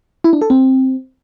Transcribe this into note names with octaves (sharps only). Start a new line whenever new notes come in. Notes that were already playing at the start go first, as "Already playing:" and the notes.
E4
D4
A4
C4